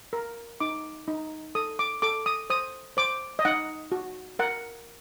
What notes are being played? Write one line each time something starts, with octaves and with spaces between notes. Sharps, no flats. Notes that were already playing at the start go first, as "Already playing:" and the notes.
A#4
D#4 D6
D#4
A4 D#6
D6
A4 D6
D#6
C5 D#6
C5 D6
D#5
D#4 F#5
F#4
A#4 F#5